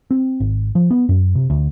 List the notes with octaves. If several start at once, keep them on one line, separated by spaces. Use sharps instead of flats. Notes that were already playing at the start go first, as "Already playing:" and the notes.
C4
G#1
F3
B3
F#2
C3
D2